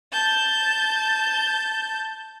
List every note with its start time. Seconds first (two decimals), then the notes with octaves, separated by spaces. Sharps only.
0.12 A5 G6